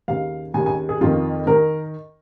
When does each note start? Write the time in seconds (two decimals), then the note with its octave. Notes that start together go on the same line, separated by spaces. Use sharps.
0.08 D#2 C#3 F5
0.54 D#2 C#3 G#5
0.66 G#5
0.89 G#4
1.01 F2 D#3 F4
1.47 D#3 A#4